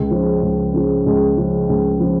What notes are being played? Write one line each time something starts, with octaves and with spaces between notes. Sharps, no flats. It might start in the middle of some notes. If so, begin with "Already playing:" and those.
Already playing: C#2
C#3 F3
C#2
C#3 F3
C#2
C#3 F3
C#2
C#3 F3